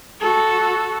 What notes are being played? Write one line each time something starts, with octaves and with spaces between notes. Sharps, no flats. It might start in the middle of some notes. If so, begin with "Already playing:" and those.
F#4 A4